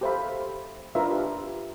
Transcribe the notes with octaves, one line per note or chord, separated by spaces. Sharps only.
G4 A4 C5 E5 F5 B5
D4 F4 A#4 B4 E5
G4